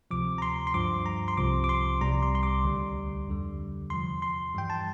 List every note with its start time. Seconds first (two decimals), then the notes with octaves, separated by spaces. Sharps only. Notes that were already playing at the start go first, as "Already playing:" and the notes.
0.11 D2 C3 F3 D6
0.38 A#5
0.42 C6
0.67 C6
0.74 G2 F3 D6
1.06 A#5
1.28 C6
1.37 C2 C3 F3 D6
1.64 D6
1.69 C6
2.01 C2 C3 G3 A#5
2.23 C6
2.35 C6
2.43 D6
2.65 D2 D3 G3
3.28 F2 D3 G3
3.90 E2 C3 F3 C6
4.22 C6
4.54 G2 E3 G3 G5
4.70 A5